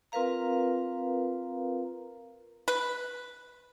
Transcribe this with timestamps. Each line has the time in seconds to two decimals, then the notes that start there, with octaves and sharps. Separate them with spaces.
0.12 C4 F4 A#4 B4 F5 A#5
2.68 B4